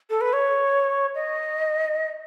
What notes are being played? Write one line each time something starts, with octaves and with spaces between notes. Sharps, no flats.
A4
B4
C#5
D#5